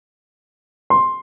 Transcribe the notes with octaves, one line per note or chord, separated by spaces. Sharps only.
C6